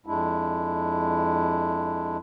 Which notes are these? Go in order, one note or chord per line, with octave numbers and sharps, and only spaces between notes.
F2 G#3 D4 E4